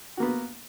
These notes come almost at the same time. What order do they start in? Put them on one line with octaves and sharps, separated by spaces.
F#4 A#3 B3